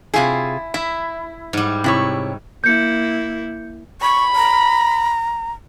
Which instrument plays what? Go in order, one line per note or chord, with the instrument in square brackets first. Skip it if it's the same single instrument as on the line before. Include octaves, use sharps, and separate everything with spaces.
[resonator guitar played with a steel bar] C3 F4 G#4 [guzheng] E4 G#5
[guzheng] E4 [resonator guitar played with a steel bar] E5
[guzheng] G#2 G3
[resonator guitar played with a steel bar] C3 E4 C#5
[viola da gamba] A#3 E4 [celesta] G6 C#7
[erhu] B5 [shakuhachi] C#6
[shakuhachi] A#5